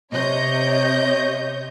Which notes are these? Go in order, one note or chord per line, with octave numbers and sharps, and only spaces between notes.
C3 C#5 D#5 G6